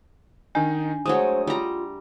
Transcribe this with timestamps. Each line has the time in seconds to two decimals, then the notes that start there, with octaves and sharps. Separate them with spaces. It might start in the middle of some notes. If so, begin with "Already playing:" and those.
0.55 D#3 D4 D#4 G#5 G6
1.06 F#3 G#3 A3 C5 D#6
1.47 G3 F4 A#5